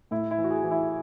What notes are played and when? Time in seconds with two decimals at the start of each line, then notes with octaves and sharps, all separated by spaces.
0.11 A2 E4
0.31 E4
0.38 E3
0.44 F#4
0.50 G#4
0.64 E3
0.71 E4